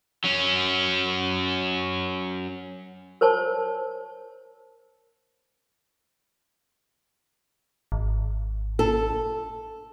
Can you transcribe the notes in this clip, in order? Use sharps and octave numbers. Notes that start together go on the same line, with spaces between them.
F#3 C#4
A#4 C5 C#5 A5
G#1
A4